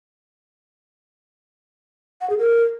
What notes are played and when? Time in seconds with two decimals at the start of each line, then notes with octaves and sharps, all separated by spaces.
2.21 F#5
2.30 G#4
2.38 A#4